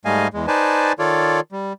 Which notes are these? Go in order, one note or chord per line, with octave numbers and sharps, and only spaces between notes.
G#2 G3 A3 D#5 F5 G#5
E2 G#3
D#4 B4 C5 D5 G#5 A5
D#3 F4 A4 C#5 D5
G3